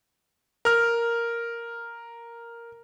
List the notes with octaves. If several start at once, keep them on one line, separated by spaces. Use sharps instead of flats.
A#4 F6